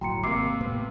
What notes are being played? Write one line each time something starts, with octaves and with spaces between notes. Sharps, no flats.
G1 A2 F#3 G5 A#5 C6 C#7
G#1 C3 A#3 D6 C7
A2 A3 B3